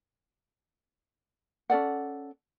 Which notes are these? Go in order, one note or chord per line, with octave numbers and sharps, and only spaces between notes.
C#4 A4 D5 F#5